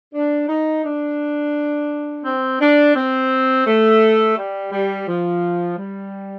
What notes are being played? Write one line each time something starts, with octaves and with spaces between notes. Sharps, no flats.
D4
D#4
D4
C4
D4
C4
A3
G3
G3
F3
G3